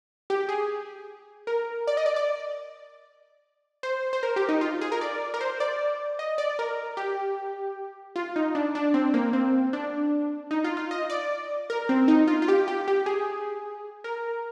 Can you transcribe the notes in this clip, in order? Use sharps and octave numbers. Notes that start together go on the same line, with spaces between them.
G4
G#4
A#4
D5
D#5
D5
D5
C5
C5
A#4
G4
D#4
F4
G#4
A#4
D5
A#4
C5
D5
D#5
D5
A#4
G4
F4
D#4
D4
D4
C4
A#3
C4
D4
D#4
F4
F4
D#5
D5
A#4
C4
D#4
F4
F4
G4
G4
G4
G#4
A#4